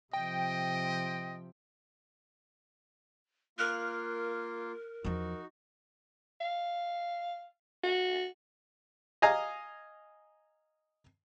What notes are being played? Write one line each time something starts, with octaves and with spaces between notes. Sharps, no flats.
C3 F3 D#5 G5
A#3 F4 A#4 F6 F#6
E2 F3 D#4 F#4
F5
F#4
D#5 F5 G#5 A#5 D#6